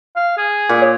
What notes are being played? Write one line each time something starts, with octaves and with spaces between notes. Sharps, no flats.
F5
G#4
A#2
C#5